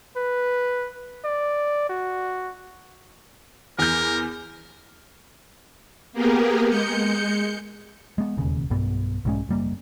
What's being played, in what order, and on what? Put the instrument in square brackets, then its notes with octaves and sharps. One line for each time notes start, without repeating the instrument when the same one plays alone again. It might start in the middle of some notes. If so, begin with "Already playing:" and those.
[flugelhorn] B4
D5
F#4
[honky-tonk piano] E2 G6 [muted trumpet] A#4
[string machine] A#3 B3 G4 G#4 A#4
G#3 G6 C#7
[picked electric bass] G#3 B3
E1 D#2 C#3
B1 G2 B3
B1 G#2 G#3 C#4
F#1 G3 A#3